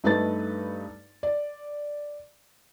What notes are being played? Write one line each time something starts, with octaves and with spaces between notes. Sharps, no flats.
G2 A3 D#4 A4 B4 A6
D5